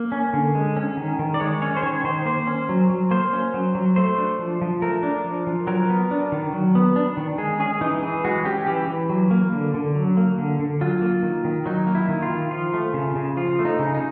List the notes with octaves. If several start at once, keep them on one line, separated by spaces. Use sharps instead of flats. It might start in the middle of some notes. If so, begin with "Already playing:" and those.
Already playing: A#3
C#4
D3
G#3
C#4
D#3
D#3
D5
G#3 C#5
C#4 C#5
C5
D#3 C#5
D#3 C5
A#3 C5
C#4
F#3
F#3
A#3 C5
C#4
F#3
F#3
A3 C5
D4
F3
F3
A3 A#4
D4
F3
F3
F#3 A#4
B3
D4
D#3
F#3
B3
D4
D#3
G#3 G#4
C#4 G#4
E3 D#4
E3 G#4
G#3 F#4
C#4 G4
E3 G4
E3
F#3
A#3
D3
D3
F#3
A#3
D3
D3
F#3 F4
A#3
D#3
D#3
F#3 D#4
A#3
E4
D#3
F4
D#3
F3 F4
A3
C#3
C#3
F3 F4
A3
D#4
C#3
D#4